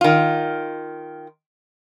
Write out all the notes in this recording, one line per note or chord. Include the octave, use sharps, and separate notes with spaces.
D#3 F4